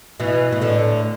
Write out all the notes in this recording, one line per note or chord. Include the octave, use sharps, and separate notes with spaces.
B2 E3
B2
A2 D3